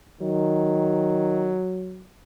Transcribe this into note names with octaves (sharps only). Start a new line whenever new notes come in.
D#3 F#3